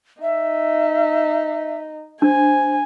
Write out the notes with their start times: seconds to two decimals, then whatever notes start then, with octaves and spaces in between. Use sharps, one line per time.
0.22 D#4 E5
2.22 D4 C5 G#5